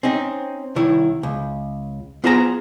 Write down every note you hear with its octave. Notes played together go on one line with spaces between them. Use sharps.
C4 C#4 D#4
C2 D#3 E4 C#5
C#2
B3 F4 G#4 C5 F5 A#5